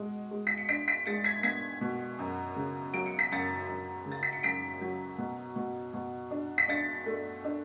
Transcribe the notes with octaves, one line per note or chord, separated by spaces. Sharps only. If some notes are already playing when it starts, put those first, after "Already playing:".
Already playing: B2 G#3
G#3
B6
C#7
D4 B6 D7
B6 D7
G#3 A6 C#7
G#6 B6
B3 G#6 B6
B2
F#2
C#3
F#3 D7
C#7
B6
F#2 A6 C#7
F#2
C#3
A6
B6
C#7
F#2 B6 D7
F#3
B2
B2
B2
D4
B6
D4 A6 C#7
A3
D4